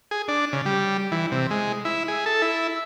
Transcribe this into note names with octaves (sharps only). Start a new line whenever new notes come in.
G#4
D4
C#3
G3
E3
C3
G#3
E4
G#4
A4
E4